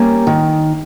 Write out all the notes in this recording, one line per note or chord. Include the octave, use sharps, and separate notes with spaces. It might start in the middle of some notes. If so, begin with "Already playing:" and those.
Already playing: G3 A#3 C#4
D#3